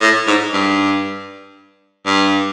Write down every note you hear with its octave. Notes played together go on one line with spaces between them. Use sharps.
A2
G#2
G2
G2